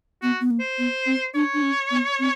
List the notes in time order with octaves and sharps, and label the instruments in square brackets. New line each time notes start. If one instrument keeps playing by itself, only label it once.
[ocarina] B3 [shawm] F#4
[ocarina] B3
A#3
[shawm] C5
[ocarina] B3
C4
[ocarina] D4 [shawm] C#5
[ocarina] D4
C#4
B3
C4